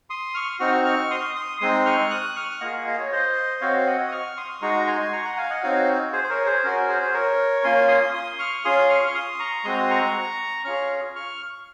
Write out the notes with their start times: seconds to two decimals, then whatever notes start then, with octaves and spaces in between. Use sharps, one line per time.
0.10 C6 D#6
0.35 C#6 F6
0.60 C4 D#4 F#4 C#6 F6
0.85 C#6 F6
1.11 C6 D#6
1.36 C6 D#6
1.61 G#3 C4 D#4 C6 D#6
1.86 C#6 F6
2.11 D#6 F#6
2.36 C#6 F6
2.61 A#3 F4 G#4 D#5 F#5
2.87 D#5
2.99 C#5
3.12 C5 D#5
3.61 C4 F#4 C#5 F5
3.86 D#5 F#5
4.08 D#6
4.12 C#6 F6
4.37 C6 D#6
4.62 G#3 D#4 F#4 A#5 C#6
4.87 G#5 C6
5.13 A#5 C#6
5.25 F#5 A#5
5.37 F5 G#5
5.50 D#5 F#5
5.63 C4 D#4 F#4 C#5 F5
6.13 G#4 C5
6.24 C5
6.30 A#4 C#5
6.46 G#4 C5
6.64 C#4 F#4 A#4
6.88 G#4 C5
7.02 C5
7.14 A#4 C#5
7.57 C#6
7.64 A#3 C#4 F4 G#5 C6
7.88 C6 D#6
8.13 C6 D#6
8.39 C#6 F6
8.64 C#4 F4 G#4 C6 D#6
8.89 C#6 F6
9.06 F6
9.15 C6 D#6
9.39 A#5 C#6
9.64 G#3 C4 F#4 C6 D#6
9.90 A#5 C#6
10.65 C#4 F4 G#4 C#6 F6
11.15 C#6 F6